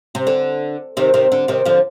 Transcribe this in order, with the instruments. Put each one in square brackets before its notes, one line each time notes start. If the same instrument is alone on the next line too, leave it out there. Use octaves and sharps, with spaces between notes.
[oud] C3
D3
C3 D#3
C3 D#3
D3
C3 D#3
D3 F3